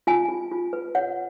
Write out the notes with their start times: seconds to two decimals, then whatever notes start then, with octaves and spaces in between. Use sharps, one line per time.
0.07 F4 G#5
0.28 F4
0.52 F4
0.73 B4
0.95 C#5 F#5